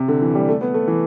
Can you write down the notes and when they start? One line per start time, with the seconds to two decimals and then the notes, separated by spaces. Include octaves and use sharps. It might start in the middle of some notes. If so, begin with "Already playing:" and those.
Already playing: C3
0.08 D3
0.22 E3
0.35 G3
0.49 A3
0.61 B3
0.74 A3
0.88 E3